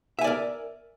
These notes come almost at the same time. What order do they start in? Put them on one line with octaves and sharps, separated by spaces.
E5 G#5 D5 A#4